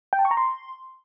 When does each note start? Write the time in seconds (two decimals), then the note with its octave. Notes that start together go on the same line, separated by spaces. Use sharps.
0.13 G5
0.19 A5
0.25 C#6
0.31 A#5
0.37 C6